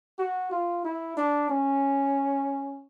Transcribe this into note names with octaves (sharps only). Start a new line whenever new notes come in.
F#4
F4
E4
D4
C#4